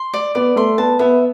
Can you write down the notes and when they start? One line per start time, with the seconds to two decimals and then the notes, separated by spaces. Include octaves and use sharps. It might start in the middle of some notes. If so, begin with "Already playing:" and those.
Already playing: C6
0.14 D5
0.35 B3 D5
0.56 A3 C6
0.78 B3 A5
0.99 B3 E5